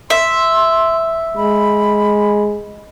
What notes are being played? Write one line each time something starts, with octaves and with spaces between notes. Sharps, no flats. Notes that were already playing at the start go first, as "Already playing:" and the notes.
E5 C6
G#3 B5